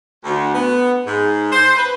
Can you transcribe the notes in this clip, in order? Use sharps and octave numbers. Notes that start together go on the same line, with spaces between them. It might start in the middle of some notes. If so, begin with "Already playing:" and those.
D2
B3
G#2
C5
B4